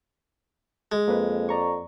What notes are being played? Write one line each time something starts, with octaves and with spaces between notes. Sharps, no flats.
G#3
F2 A#3 B4
D5 A#5 C#6